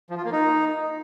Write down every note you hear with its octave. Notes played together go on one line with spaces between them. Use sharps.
F3
F4
A#3
D#4